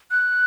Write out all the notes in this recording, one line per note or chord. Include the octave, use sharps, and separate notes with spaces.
F#6